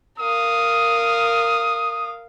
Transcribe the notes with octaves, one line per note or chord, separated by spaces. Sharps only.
A#4 F5 D#6